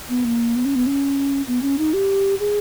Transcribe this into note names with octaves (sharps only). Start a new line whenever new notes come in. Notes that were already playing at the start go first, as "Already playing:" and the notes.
B3
A#3
B3
C#4
B3
C#4
B3
C#4
D#4
G4
G#4